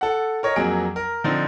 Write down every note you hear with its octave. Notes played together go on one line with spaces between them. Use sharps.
A4 F#5
A#4 C#5 D#5
F2 F#3 A#3 G#4 D7
A#4
D3 F3 C4 D#4